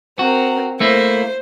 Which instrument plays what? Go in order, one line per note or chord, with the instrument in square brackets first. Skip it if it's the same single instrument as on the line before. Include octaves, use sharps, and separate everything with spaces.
[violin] C4 A#4 [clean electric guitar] F#4
[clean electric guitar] A3 A#3 E4 [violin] C5